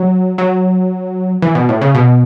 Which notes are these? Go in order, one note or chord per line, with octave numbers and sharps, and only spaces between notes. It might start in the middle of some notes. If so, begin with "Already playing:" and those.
Already playing: F#3
F#3
E3
B2
A2
C#3
B2